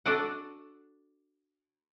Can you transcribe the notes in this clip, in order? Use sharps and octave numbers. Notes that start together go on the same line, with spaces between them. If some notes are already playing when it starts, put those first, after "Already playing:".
D4 F#4 A4 D5 D#5 F#5